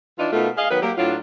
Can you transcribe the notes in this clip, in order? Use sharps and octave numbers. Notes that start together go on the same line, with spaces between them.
E3 D4 D#4 F4
B2 A3 A#3 D#4 F4
G#4 D#5 F5
D#3 F#3 B3 B4
F#3 A#3 G4
A2 F#3 D4 F4